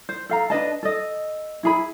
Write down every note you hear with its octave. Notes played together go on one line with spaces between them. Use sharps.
C5
A4 F5 A#5
D4 B4 D#5 A5
A4 D#5
E4 G#4 B5